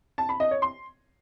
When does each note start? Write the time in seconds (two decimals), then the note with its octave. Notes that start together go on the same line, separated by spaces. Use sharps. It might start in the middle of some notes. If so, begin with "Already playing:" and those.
0.18 A5
0.29 B5
0.40 D#5
0.51 C#5
0.62 C6